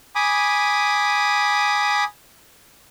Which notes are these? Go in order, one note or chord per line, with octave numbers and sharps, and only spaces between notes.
G#5 B5 D6 D#6